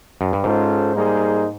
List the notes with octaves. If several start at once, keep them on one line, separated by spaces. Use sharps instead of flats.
F#2
G2
G#2 G#3 C#4 F4 A4 C5
G3 A#3 D#4 G#4 C5